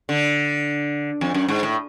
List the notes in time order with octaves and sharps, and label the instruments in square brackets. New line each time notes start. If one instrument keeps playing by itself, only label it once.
[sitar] D3
F2
F#2
G#2
A2